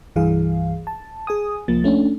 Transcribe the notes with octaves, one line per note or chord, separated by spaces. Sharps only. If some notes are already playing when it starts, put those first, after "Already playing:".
C2 G2 E3 G#4 F5
A5
G#4 G#5 D#6
C2 F3 A#3 A6
A3 C#4 D4